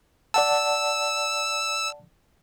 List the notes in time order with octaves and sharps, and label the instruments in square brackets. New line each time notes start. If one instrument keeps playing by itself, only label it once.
[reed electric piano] D5 F#5 A5 [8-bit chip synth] E6